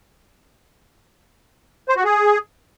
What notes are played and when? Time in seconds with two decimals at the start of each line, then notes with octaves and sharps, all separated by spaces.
1.89 C5
1.97 F#4
2.04 G#4